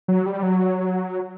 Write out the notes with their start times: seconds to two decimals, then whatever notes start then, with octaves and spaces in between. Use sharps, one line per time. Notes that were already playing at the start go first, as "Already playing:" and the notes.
0.08 F#3
0.26 G3
0.43 F#3